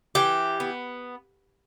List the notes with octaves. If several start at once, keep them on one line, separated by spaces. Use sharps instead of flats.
E3 G4
B3